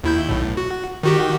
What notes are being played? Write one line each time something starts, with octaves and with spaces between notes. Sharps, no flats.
D#2 E4 G6
B1 A2
F#4
D#3 F#4 G4